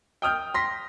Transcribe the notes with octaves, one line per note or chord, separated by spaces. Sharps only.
G5 D#6 F6 G6
C6 A#6 B6